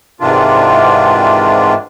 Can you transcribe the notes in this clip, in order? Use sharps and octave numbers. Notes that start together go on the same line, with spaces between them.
G#2 C3 D#3 E3 D4 F4